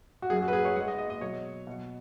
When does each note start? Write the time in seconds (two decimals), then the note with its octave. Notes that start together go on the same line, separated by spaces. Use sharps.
0.22 F#4
0.30 F#2 F#3 G#4
0.42 F#4
0.48 B4
0.53 G#4
0.65 C#5
0.76 G#2 F#5
0.80 G#3
0.88 D#5
0.98 D#5
1.10 D#5
1.21 B2 F#3 C#5
1.67 B2 F#3